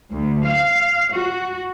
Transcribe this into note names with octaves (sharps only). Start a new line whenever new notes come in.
D2
F5
F#4